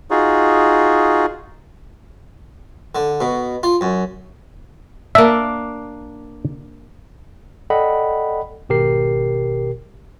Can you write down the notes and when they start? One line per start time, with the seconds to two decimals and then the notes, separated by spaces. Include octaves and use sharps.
0.11 D#4 F4 F#4 G#4
2.95 D3
3.21 B2
3.63 F4
3.81 F#2
5.15 A#3 D4 E5
7.70 A4 D5 D#5 F#5 G5 B5
8.69 G#1 B2 G4 A#4 C7